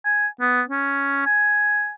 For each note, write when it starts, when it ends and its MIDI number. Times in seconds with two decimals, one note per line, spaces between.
0.06 0.27 80
0.41 0.62 59
0.70 1.23 61
1.26 1.94 80